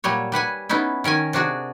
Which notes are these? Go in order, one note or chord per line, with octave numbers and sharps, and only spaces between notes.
A#2 F#3 G3 C#5
G3 B4 F#5 G#5
B3 C#4 D#4 E4
D#3 C#4 A#4 G#5
C3 D4 F#4 G#4